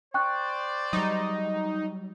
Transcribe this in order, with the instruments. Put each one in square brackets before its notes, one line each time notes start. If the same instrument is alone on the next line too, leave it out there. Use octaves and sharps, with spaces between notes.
[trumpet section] C5 D5 [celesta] G5 C#6 F#6
[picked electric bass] F#3 G3 [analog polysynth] D#4